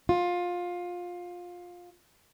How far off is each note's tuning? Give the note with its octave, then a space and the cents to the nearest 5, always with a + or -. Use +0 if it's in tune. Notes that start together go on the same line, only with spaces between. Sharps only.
F4 +20